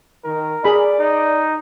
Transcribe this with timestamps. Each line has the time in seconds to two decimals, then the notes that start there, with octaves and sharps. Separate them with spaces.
0.25 D#3 A#4
0.64 G#4 D5 B5
1.00 D#4